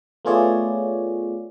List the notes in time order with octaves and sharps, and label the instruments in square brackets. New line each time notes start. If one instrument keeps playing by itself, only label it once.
[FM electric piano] A3 B3 F4 G#4 C#5 D5